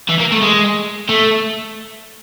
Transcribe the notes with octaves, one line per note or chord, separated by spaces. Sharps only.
E3
A#3
A3
G#3
A3